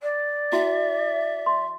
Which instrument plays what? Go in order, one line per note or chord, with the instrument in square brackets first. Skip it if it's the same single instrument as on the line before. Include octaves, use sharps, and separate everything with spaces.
[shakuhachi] D5
[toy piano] E4 F#4 G5 [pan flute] E5
[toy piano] C6